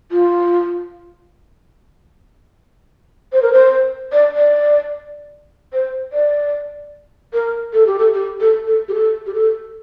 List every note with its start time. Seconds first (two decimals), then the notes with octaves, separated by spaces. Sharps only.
0.12 F4
3.33 C5
3.42 A#4
3.53 C5
4.12 D5
4.36 D5
5.73 C5
6.13 D5
7.34 A#4
7.73 A4
7.87 G4
7.99 A4
8.14 G4
8.41 A4
8.67 A4
8.88 G4
8.94 A4
9.26 G4
9.34 A4